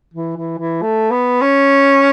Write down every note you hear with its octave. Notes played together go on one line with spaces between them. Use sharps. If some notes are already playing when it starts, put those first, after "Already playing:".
E3
E3
E3
A3
B3
C#4